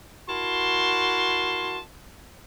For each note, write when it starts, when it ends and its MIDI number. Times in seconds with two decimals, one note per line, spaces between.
0.28 1.80 64
0.28 1.80 66
0.28 1.80 70
0.28 1.80 81
0.28 1.80 84